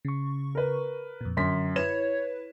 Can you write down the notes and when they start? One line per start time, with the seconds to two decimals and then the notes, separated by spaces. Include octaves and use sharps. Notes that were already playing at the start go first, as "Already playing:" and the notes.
0.05 C#3 C#6
0.55 A#4 B4
1.21 F2 A#2
1.37 F#2 D3 C6 B6
1.76 E4 B4 C#5 E7